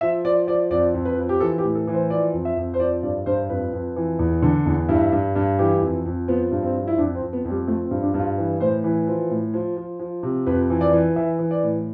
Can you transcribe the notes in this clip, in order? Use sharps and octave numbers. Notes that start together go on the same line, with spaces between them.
F3 E5
F3 D5
F3 D5
F2 D5
F2
B4
F3
G4
E3 A4
G4
A2
A4
E3
C5
F3 D5
F2
E5
F2
C5
F3 D5
G2 D5
G2 C5
F2 B4
F2
E3
E2
D3
E2
G2 E4
G2
G2
E3 G4
F2
F2
F3 B3
G2
C4
F3
E4
F2 D4
C4
F2
B3
F2
G3
F3 A3
C4
G2
D4
G2
F4
E3
A2 C5
E3 B4
F3
A2
F3
F3
F3
C3
F2 B4
E3
D5
E3
E3 E5
E3
D5
A2